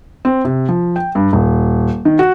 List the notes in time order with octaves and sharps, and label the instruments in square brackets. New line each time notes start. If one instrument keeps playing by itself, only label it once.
[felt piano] C4
C3
F3
G5
G2
D#1
D#3
F#4